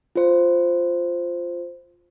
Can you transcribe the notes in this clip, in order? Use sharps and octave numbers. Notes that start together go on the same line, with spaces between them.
F4 C5